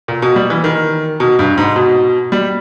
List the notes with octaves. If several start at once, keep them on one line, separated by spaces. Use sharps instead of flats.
A#2
B2
G3
E3
D#3
B2
G2
G#2
B2
G3